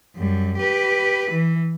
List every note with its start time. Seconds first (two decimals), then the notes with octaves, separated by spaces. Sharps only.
0.16 F#2 G3
0.58 G4 B4
1.31 E3